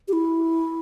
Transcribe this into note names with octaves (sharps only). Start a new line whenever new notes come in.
G4
E4